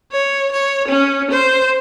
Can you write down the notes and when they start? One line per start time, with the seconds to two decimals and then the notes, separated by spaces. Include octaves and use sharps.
0.12 C#5
0.52 C#5
0.88 C#4
1.31 C5